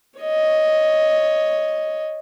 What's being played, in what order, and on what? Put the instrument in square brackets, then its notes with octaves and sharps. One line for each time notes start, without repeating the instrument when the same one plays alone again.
[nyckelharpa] C#5 D#5